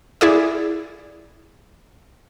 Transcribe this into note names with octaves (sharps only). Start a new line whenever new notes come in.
E4 G#4 D5